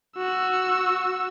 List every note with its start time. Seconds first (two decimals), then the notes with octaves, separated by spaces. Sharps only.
0.17 F#4 E6